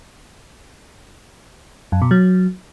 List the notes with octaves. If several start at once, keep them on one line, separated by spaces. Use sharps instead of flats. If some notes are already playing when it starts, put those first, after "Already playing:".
F#2
B2
F#3